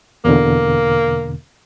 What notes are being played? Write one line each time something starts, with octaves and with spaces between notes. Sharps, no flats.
E2 B2 D3 A#3